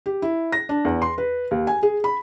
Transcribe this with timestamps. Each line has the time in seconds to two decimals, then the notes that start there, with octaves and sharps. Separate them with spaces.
0.06 G4
0.22 E4
0.52 A#6
0.69 D4
0.85 E2
1.02 C6
1.18 B4
1.51 D#2
1.67 G#5
1.83 G#4
2.04 B5